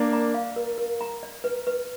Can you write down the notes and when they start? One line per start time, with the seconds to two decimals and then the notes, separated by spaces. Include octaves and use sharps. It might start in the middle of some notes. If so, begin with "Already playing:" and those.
Already playing: A#3 D4 A#4
0.13 A#5
0.34 F5
0.56 A#4
0.78 A#4
1.01 A#5
1.23 D5
1.44 B4
1.67 B4